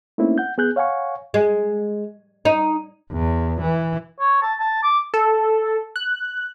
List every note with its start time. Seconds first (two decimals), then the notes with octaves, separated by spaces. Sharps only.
0.18 A3 A#3 C4 C#4 D#4 E4
0.38 F#5 G6
0.58 B3 G#4 F#6 G6
0.76 C#5 F5 F#5 G#5 C#6
1.34 G#3
2.45 D#4
3.12 E2
3.61 E3
4.20 C#5
4.42 A5
4.60 A5
4.83 D6
5.14 A4
5.96 F#6